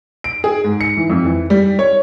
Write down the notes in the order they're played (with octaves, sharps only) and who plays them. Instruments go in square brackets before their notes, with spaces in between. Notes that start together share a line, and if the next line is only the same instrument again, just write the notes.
[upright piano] D7
G#4
G#2
C#7
E3
F2
E3
G3
C#5